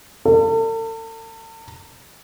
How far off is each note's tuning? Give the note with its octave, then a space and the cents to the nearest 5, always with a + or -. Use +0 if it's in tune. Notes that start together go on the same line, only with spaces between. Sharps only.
A4 +40